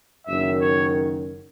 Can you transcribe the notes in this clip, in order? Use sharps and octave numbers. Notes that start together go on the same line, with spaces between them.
F#1 F#2 D#3 E5
C#5